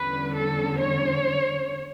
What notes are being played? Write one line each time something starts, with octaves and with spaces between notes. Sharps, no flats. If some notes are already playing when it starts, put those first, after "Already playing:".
Already playing: E2 D3 G3 C#4 B4
A4
C#5